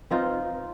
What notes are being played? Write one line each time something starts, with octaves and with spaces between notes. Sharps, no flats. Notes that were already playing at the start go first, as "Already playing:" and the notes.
C4 D#4 F4